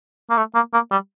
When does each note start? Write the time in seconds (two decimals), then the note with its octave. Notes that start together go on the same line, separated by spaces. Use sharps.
0.30 A#3
0.37 A3
0.55 A#3
0.74 A#3
0.91 G3